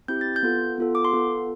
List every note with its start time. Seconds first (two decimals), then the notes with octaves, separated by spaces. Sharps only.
0.08 C4 E4 G4 G6
0.21 A6
0.36 G6
0.43 B3 F4 A4
0.78 B3 F4 A4
0.95 D6
1.05 C6
1.13 B3 F4 A4